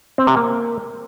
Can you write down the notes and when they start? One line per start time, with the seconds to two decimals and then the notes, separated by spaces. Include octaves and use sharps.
0.18 C4
0.27 C3
0.36 A#3